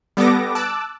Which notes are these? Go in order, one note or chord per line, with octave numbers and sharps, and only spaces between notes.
G3 B3 A4 D6 A#6
A5 D6 E6 F#6